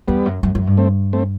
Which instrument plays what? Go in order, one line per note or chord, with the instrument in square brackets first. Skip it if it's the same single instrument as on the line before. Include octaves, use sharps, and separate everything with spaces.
[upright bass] E2 [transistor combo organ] G3 B3
[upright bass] F#2
F#2
F#2
G2
[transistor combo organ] A3 C4
A3 C4